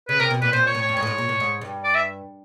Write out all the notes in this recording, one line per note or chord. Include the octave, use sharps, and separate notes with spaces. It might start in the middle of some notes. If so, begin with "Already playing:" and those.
C#3 B4
C3 A#4
B2
A#2 B4
A#2 C5
C#5
A2
C#5
G2
G#2 C#5
A2
G#2
A#2
A2
G#2
G2
D5
E5